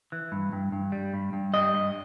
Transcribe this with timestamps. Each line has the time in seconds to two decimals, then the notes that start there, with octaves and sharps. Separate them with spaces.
0.12 E3
0.32 G2
0.53 G2
0.72 G2
0.92 G3
1.14 G2
1.33 G2
1.54 G3 D#5
1.74 G2